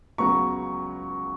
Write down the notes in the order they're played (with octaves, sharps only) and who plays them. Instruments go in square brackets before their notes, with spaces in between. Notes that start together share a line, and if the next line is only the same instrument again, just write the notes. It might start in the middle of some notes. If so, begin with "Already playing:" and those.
[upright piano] C#2 C#3 F#3 B3 [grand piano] A#5 C#6